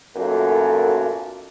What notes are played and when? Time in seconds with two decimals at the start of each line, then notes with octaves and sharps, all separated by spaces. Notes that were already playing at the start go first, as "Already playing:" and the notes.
0.17 B1 F#2 A3 A#3 F4 A4